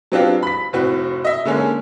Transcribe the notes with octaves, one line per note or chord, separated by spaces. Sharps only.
F#3 B3 C4 D4 F4 G4
B5 B6
F1 A2 C4 F#4
D#5 E5
D3 G#3 A#3 C#4